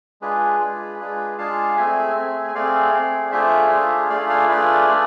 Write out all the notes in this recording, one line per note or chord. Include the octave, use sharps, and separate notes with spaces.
G#3 D4 F4 G#4 B4
G#3 D4 F4 G#4
G#3 D4 F4 G#4
G#3 D4 F4 G#4 F5 A5
A3 C4 G#4 E5 G#5
A3 C4 G#4
G#5
A3 C4 G#4 D5 F5
A3 C4 G#4
A3 D4 F4 G#4 C5 E5
A3 D4 F4 G#4
A3 D4 F4 G#4 D5 F5
D5 F5
A3 D4 F4 G#4 B4 D5
A3 D4 F4 G#4